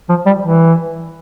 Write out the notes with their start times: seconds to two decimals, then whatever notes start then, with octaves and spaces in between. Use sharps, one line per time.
0.09 F3
0.26 G3
0.43 E3